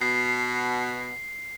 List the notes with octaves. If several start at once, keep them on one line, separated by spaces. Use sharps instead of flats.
B2 C7